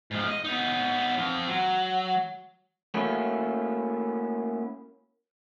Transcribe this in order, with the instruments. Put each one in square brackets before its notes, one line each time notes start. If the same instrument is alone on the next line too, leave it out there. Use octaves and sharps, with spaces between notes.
[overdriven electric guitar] G#2 F3
D#5
B3 D#4
F3 C4
F#3
[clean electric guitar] A3 A#3 C#4 E4 F#4